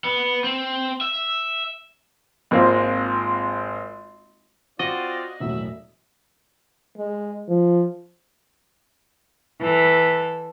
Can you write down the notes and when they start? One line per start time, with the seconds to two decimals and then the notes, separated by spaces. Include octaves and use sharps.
0.04 B3
0.44 C4
1.01 E5
2.51 G#1 G#3 A#3 C4 F4
4.79 C4 F4 F#4 D5 D#5
5.40 E1 A2 F#3 E5
6.98 G#3
7.49 F3
9.60 E3 A4